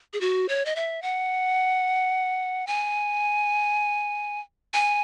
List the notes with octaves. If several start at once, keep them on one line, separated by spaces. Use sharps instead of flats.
G#4
F#4
C#5
D#5
E5
F#5
G#5
G#5